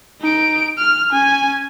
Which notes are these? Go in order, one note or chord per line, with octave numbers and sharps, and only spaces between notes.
D#4 D7
F6
C#4 G#5